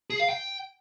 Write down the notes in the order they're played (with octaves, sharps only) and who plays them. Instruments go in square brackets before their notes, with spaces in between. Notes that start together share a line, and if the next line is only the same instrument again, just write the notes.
[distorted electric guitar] G#4
F5
G5